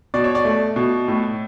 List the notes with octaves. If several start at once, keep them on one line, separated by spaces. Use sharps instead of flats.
B2 D5
C#5
D5
A3
B2
A2